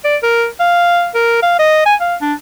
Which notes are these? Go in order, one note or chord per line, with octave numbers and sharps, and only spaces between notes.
D5
A#4
F5
A#4
F5
D#5
G#5
F5
D4